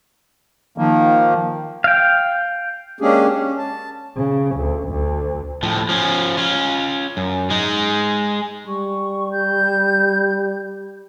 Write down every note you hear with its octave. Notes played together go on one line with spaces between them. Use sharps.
D#3 F3 A#3
F5 G5
G#3 A#3 C#4 D4 G4 G#4
C#4
A5
C#3
D2
D2
A2 F3
F3 C#4
C#4 F4
F#2
G#3 D#4
G3 C#6
G6